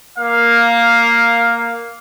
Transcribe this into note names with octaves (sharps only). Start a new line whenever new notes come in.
A#3 F5